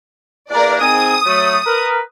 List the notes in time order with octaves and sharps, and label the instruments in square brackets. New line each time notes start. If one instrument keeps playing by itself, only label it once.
[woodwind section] E2 A#3 D4 [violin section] A#4 D5
[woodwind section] G#2 C4 G#5 [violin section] D#6
[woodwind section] F#3 A3
A#4 B4